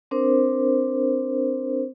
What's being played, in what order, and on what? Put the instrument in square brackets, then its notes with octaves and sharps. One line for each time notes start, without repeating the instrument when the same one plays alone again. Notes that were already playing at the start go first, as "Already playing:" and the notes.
[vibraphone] C4 D4 A#4 C5